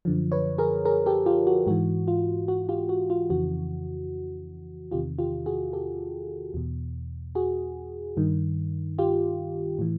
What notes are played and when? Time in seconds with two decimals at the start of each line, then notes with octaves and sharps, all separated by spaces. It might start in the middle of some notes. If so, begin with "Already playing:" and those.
0.05 F#2 D3 F3
0.32 B4 C#5
0.58 G#4 A#4
0.85 G#4 A#4
1.06 G4 A4
1.26 F4 G4
1.47 F#4
1.67 G#2 E3 F#4
2.08 F4
2.48 F#4
2.69 F4 G4
2.89 F#4
3.10 F4
3.30 F2 C#3 E3 F#4
4.91 E2 C3 D#3 F4 G4
5.18 F4 G4
5.46 F#4 G#4
5.73 G4 A4
6.54 E2 B2
7.35 F#4 G#4
8.17 G2 D#3
8.99 F4 G4
9.79 A2 E3